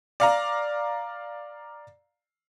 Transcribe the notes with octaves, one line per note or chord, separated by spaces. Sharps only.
D5 F5 A#5